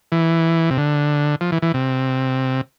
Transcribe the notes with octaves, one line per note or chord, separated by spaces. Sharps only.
E3
C3
D3
F3
E3
E3
C3